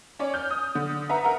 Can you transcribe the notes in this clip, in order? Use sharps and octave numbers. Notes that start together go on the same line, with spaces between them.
C#4 C#5 D5
F6 G6
D#6
D3
B4 E5 F#5 A#5
A#4 F#5 A#5